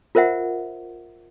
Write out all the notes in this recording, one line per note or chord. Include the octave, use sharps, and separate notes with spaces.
F4 A#4 C5 E5 F#5